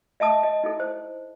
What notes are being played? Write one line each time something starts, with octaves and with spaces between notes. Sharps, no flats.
D#5 E5 A5 D#6
D#5
D#4 E4 A4
C5